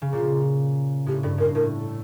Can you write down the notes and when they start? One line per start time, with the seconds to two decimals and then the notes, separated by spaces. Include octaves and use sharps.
0.02 C#3
0.12 A#2 F4
1.06 A2 G4
1.23 G2 A4
1.38 A2 A#4
1.55 A2 A#4
1.78 A4